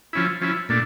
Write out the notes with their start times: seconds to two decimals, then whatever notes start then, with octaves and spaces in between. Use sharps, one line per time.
0.13 F3 C#4 E4
0.41 F3 C#4 E4
0.69 A#2 A3 D4